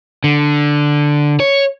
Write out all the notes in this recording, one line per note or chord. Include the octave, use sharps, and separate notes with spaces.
D3
C#5